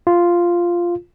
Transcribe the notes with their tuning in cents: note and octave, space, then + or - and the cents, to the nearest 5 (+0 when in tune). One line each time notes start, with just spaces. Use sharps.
F4 -5